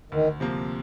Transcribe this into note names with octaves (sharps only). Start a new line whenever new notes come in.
D2 D#3
C3 F3 A#3